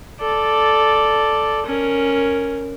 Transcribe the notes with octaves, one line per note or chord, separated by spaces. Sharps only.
A4 D5
C#4 A#4